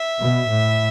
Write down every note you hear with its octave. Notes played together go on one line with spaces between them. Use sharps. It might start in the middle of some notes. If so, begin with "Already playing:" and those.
Already playing: E5
B2
A2